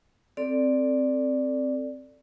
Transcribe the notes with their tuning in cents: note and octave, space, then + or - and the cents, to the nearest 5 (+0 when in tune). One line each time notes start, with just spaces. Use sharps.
C4 +5 A4 +10 D5 +0